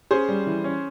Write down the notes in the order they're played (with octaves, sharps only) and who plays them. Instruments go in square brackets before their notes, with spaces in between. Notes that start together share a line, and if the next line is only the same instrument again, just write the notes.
[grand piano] C#4 G#4 C5
G3
E3
C#4